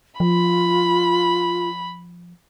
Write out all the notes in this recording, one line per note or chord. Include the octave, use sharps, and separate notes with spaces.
F3 F4 B5